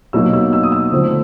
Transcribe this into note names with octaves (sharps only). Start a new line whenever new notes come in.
B2 F#3 A#3 D#4 E6
E6
E6
D#6
E6
D3 F3 A3 C4